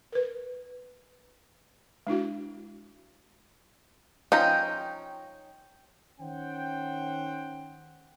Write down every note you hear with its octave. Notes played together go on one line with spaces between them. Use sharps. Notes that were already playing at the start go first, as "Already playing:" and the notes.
A#4 B4
G#3 D4 E4 F#4
F3 C#4 D#4 G5 A#5
D#3 C#4 C5 F#5 G5